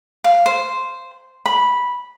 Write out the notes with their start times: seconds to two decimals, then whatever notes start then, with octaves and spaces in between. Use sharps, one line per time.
0.24 F5
0.46 C5
1.46 B5